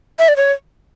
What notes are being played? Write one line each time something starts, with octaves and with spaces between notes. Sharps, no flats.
E5
D5
C#5